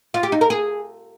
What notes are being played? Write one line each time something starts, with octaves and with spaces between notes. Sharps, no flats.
F4
G4
D#4
A#4
G#4